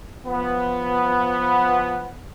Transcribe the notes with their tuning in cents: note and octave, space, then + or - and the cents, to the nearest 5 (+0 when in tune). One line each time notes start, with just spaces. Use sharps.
F3 +5 B3 +0